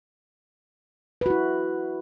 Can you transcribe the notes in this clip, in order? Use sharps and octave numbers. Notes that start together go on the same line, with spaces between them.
E4 F#4 B4